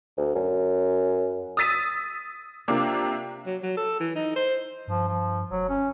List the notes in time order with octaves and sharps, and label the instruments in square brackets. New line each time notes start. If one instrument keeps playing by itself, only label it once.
[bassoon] D2
F#2
[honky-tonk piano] D#6 E6 A6 B6 D#7
C3 A#3 D4 F4
[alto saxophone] F#3
F#3
A4
E3
D#4
C5
[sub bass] G2 [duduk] F3
[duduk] F3
[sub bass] F1 [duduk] F#3
[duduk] C#4